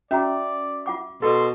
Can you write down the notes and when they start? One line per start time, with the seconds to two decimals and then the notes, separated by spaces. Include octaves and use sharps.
0.11 C#4 F#4 D5 E5 A#5
0.86 F4 F#5 D6
1.22 B2 A4 C6